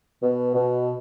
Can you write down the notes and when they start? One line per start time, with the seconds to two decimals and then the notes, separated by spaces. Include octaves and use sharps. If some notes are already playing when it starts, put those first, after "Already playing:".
0.22 B2
0.54 B2